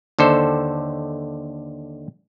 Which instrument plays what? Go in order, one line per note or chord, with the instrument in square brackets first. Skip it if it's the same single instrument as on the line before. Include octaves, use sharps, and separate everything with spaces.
[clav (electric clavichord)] D#2 D3 A4 C5